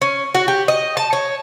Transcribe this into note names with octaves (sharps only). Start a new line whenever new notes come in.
C#4
F#4
G4
D#5
A5
C#5